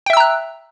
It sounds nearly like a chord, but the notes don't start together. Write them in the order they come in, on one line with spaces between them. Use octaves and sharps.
G5 E5 E6 A#5 F#6